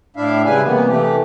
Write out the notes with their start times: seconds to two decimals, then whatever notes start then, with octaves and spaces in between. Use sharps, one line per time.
0.16 A2 D4 E4 E5 F5
0.45 C#3 G3 G#3 E4 B4 G#5
0.63 C3 E3 A#3 B3
0.88 C3 E3 A3 G4